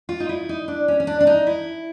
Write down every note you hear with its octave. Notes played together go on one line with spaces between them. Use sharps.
F4
D#4
E4
D#4
D4
C#4
C#4
D4
D4
D#4
E4